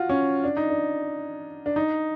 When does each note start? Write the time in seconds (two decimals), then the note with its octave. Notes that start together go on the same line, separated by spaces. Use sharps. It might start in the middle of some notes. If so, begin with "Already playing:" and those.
Already playing: F4 F#4
0.09 C#4
0.44 D4
0.57 D#4
0.70 D4
1.66 D4
1.76 D#4